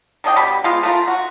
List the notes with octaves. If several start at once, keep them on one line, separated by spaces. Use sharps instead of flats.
D#3 D4 D#5 G5
B2 G3 B5
G#3 B3 F4
A3 F4 A#4
F#4